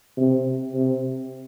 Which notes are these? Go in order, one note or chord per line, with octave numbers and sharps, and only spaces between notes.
C3
C3